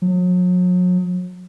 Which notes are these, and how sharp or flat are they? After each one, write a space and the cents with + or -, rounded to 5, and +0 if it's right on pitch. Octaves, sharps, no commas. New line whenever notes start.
F#3 -40